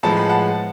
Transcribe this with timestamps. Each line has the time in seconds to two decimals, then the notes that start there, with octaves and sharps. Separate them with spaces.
0.03 A2 F3 G#3 B3 A5
0.17 B5
0.29 F#5 A5